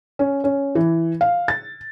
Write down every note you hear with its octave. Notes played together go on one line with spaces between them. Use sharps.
C#4
C#4
E3
F5
A6